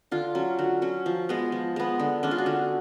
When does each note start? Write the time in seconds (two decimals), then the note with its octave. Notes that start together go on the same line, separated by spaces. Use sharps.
0.11 D3 F4
0.35 F#3 C#4
0.58 D3 F#4
0.82 F#3 C#4
1.06 F3
1.29 G#3 B3
1.52 F3
1.76 G#3 B3
1.99 D3
2.23 G#3 C#4 D4
2.31 F4
2.38 F#4
2.46 D3 G#4